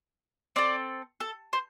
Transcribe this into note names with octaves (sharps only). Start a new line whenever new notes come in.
C4 A4 D5
A4
C5